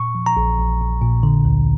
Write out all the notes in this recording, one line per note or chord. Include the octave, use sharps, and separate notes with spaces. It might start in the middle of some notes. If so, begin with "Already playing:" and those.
Already playing: A#2 C#6
F3
A#5
A#1
A#1
A#1
A#2
D3
D2